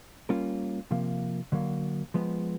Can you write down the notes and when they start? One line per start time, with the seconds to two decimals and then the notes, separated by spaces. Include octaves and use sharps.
0.29 G3 A#3 C#4 F4 A#4
0.91 C3 F3 A#3
1.52 D3 F#3 A#3
2.14 F3 G#3 B3